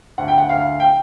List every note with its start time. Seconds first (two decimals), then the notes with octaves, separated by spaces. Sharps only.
0.18 D2 F#5
0.28 G5
0.38 F#5
0.49 D2 F5
0.80 G5